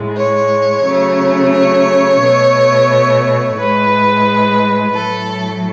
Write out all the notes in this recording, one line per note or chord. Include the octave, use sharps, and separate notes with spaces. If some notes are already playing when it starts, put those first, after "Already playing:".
Already playing: A2 G#3
C#5
C#3 F#3 A3
C#5
B2 A3
A2 G#3 B4
A2 F#3 A3 A4